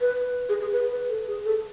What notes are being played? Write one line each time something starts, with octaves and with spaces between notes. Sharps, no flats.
B4
G#4
G#4
B4
B4
A4
G#4
A4